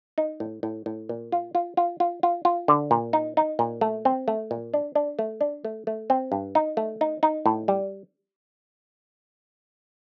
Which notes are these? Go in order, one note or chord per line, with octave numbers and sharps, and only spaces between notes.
D#4
A2
A2
A2
A#2
F4
F4
F4
F4
F4
F4
D3
A#2
D#4
D#4
A#2
A3
C4
A3
A#2
D4
D4
A3
D4
A3
A3
C4
G2
D#4
A3
D#4
D#4
A2
G3